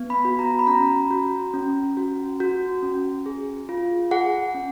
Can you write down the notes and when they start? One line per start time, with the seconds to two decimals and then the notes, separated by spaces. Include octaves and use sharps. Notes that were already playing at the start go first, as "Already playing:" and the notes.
Already playing: B3
0.10 B5
0.25 F#4
0.39 A#5
0.59 B5
0.67 C#4 A#5
1.11 F#4
1.54 C#4
1.97 F#4
2.40 F#4
2.83 C#4
3.26 G#4
3.69 F4
4.11 G#4 F#5
4.54 C#4